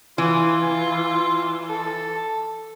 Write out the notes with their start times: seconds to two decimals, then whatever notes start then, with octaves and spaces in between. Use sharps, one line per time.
0.18 E3 F4
1.70 A4